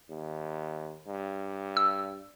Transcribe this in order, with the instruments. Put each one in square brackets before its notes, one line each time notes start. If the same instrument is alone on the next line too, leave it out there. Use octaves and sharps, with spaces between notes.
[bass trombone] D#2
G2
[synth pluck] E6